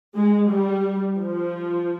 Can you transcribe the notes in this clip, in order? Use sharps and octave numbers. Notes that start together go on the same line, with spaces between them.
G#3
G3
F3